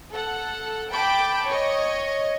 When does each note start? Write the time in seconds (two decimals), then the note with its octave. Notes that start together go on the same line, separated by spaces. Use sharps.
0.11 A4 F#5
0.92 G5 A5 B5 D6
1.48 C#5 D#5